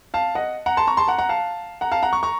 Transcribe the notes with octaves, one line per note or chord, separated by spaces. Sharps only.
F5 A5
D#5 F#5
F#5 A#5
A5 C6
A#5 C#6
A5 C6
F#5 A#5
F#5 A#5
F5 A5
F#5 A#5
F5 A5
F#5 A#5
A#5 C#6
A#5 C#6